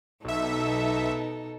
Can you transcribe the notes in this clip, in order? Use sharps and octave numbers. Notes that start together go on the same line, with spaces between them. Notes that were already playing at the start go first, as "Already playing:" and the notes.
B1 B2 D#4 A4 E5